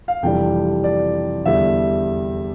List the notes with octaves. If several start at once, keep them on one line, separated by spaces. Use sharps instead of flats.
F5
F2 C3 E3 G3 D4 G5
D5
E2 D3 G3 E5